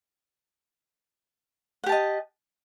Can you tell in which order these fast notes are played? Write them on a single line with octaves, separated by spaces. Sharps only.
F#5 G4 A5 D#5